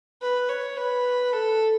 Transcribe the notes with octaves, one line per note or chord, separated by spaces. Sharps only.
B4
C#5
B4
A4